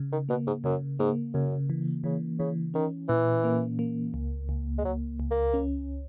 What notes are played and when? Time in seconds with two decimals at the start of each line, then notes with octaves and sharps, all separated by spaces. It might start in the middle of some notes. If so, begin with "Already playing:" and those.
Already playing: C#3
0.12 D#3
0.29 B2 A#3
0.47 G#2
0.64 F#2 C#3
0.99 G#2 A#3
1.34 F#2 C#3
1.70 E3
2.04 C#3 E3
2.39 C#3 E3
2.74 D#3 C#4
3.09 A#2 E3
3.44 A#3
3.79 A#3
4.14 C#2
4.49 C#2
4.78 G#3
4.84 C#2 F#3
5.20 C#2
5.31 A#3
5.54 C#4